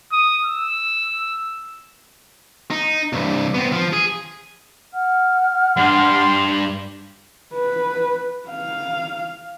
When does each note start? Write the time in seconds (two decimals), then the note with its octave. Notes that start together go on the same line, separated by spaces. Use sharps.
0.12 D#6
0.45 E6
2.71 D#4
3.13 C2 G2
3.54 B3 C4
3.73 F3
3.93 G#4
4.94 F#5 F6
5.77 G2 G4 C6
7.54 B4
8.49 F5